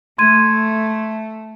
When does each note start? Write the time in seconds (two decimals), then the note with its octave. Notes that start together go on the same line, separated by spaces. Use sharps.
0.18 A3 C6 G#6 D#7